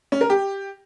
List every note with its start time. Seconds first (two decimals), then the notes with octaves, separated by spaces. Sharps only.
0.12 C#4
0.21 A#4
0.30 G4